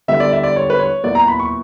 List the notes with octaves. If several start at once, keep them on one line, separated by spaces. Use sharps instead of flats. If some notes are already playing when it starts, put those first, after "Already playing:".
D3 G3 B3 E4 E5
D5
E5
D5
C#5
B4
C#5
A#2 F#3 B3 E4 D5
A#5
B5
C#6